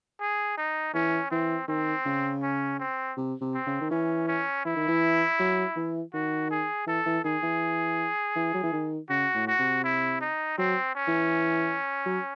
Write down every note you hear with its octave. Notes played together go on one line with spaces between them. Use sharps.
G#4
D#4
E3 C#4
E3 C4
D#3 C4
C#3
C#4
C4
C3
C3
C4
C#3
D#3
E3 C#4
C#4
E3 E4
D#3
E3
F#3
E3
D#3 F#4
G#4
E3 A4
E3
D#3 G#4
E3
E3
F#3
E3
D#3
C#3 F#4
A2
F#4
C3
E4
D#4
F#3 C4
C#4
E3
F#3